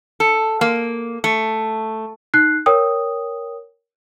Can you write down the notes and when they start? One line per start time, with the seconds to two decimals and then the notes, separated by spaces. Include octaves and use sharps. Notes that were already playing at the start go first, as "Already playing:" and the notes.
0.20 A4
0.61 A#3
1.24 A3
2.34 D#4 F#6 C7
2.66 A#4 C#5 G5 D#6